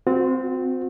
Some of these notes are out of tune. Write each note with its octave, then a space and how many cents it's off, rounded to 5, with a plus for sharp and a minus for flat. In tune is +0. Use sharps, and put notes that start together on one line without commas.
C4 -15 F#4 -40